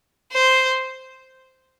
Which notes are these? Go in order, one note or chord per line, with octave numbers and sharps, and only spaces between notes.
C5